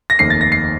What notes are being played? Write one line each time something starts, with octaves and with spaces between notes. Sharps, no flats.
A#6
F1 D#2 D#3 C7
A6
A#6
C7